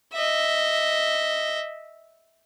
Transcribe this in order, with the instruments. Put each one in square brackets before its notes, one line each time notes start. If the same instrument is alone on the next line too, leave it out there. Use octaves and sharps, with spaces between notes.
[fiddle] D#5 E5